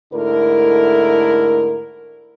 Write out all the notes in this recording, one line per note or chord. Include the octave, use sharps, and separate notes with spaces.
G#2 D3 A3 E4 A#4